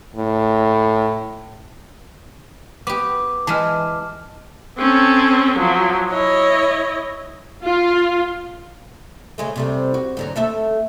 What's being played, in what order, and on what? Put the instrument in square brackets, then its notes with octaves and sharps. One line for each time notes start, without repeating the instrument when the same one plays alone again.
[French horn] A2
[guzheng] B3 G4 [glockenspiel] D6
[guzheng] E3 G#3 [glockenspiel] A5 F6
[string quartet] C4 C#4 A4
F3 F#3
E4 C#5 D#5
[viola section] F4
[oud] C#3 G#3 A3
C3 G3 A3
F#4
G#2 D3 F#3
A3 A4 E5